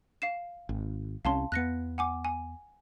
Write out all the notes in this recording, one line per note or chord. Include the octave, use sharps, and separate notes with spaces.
F5 C7 E7
G#1
C2 C4 C#4 F5 A5 C6
E2 B3 F#6 A#6 C#7
F#5 G#5 D6
G#5